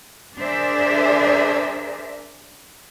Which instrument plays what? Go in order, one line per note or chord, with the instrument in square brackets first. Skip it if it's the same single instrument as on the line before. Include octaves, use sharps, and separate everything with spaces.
[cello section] D4 G#4 A#4 C5 D5 E5